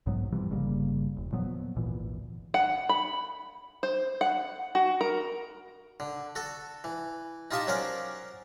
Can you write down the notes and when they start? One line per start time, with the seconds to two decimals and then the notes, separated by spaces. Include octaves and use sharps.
0.06 B1 G#2 F#3 B3
0.32 C3 E3 F3 G3
0.50 G1 C#3 G3 A#3
1.17 E1
1.32 A#2 F3 F#3 B3
1.76 G#1 D2 A#2 E3
2.54 F#5
2.89 B5
3.83 C5
4.21 F#5
4.75 F#4
5.01 A#4
6.00 D3
6.36 F#4 A4
6.84 E3
7.51 D#4 F4 G4 D#5 A5 C#6
7.67 F#3 C#4 A#4 C5 D5